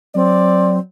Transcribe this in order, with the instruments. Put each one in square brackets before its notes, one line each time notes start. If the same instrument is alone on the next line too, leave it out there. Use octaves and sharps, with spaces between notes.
[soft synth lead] F#3 [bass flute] C4 [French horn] D5